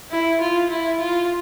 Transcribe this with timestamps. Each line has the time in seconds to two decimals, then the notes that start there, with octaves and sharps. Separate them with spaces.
0.11 E4
0.41 F4
0.71 E4
1.00 F4